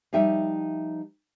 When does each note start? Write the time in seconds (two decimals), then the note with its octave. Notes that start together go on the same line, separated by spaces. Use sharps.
0.13 F3 G3 D#4 E5 G5